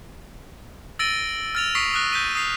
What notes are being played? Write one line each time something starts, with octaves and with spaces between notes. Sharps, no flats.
E6 A6 A#6 D7 D#7 G7
F6 A6 F7
C#6 D#6 B6 C7 D7
D#6 F6 F#6 A#6
G6 B6 D#7
D#6 C7 F7